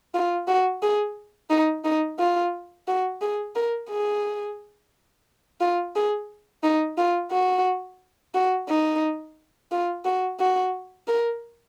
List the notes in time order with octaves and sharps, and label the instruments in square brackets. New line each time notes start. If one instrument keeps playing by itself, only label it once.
[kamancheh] F4
F#4
G#4
D#4
D#4
F4
F#4
G#4
A#4
G#4
F4
G#4
D#4
F4
F#4
F#4
D#4
F4
F#4
F#4
A#4